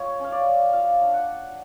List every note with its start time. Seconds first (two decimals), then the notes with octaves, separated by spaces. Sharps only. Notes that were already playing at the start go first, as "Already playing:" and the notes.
Already playing: G#3 F4 C#5
0.19 C#4
0.24 F5
0.32 D5
0.46 G#3
0.73 F4 F5
1.00 D4
1.13 F#5